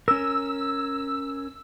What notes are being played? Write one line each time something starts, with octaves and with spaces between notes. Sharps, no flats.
C#4 A#4 E6